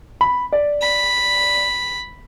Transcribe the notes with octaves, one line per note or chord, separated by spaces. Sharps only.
B5
D5
B5